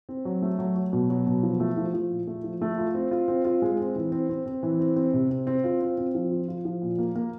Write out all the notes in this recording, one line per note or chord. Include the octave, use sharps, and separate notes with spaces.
C4
F#3
A3
F#3
F#3
B2
F#3
B2
F3
A3
F3
F3
A#2
A3
F3
A3
F4
C4
F4
C4
F4
G#3
C4
E3
C4
C4
C4
E3
C4
C4
C3
C4
C4
F4
C4
C4
F3
F4
F4
F3
A#2
A#3
A#3